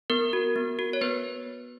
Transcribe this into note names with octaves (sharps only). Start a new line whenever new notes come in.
B3 A#4
F#4
B3
F#4
C#5
B3 B4